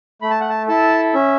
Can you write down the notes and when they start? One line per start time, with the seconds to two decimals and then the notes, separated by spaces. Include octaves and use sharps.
0.22 A3 B5
0.30 A5
0.41 F#5
0.49 A5
0.68 E4 A4 A5
1.14 C#4 E5